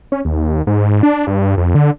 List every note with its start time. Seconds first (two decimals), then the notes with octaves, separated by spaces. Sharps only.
0.12 C#4
0.25 D#2
0.67 G#2
1.03 D4
1.27 G2
1.57 F2
1.75 D3